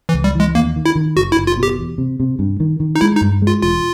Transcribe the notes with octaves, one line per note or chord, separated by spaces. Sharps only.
E3
C#2
G3
E3 G#3
D#2 A#3
D#3
E4
D#3
F#1 F#4
E4
F#1
F4
B2
G4
E2
C3
C3
G2
D#3
D#3
D#4
G#3 E4
D#4
G2
G#3
F4
E1 F4